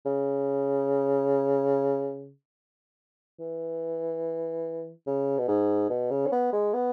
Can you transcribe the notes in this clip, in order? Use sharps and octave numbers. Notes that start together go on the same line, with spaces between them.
C#3
E3
C#3
B2
G#2
B2
C#3
C#4
B3
G#3
B3